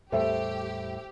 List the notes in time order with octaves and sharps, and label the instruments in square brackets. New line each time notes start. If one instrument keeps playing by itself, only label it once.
[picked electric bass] E2 A2 G3 [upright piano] A3 [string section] G4 [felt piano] C5 E5